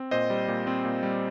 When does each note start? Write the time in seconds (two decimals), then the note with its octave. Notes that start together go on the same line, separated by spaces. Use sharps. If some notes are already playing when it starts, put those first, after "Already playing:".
Already playing: C4
0.11 A#2 C5 D#5
0.30 G3
0.48 A#2
0.67 C4
0.85 A#2
1.03 G3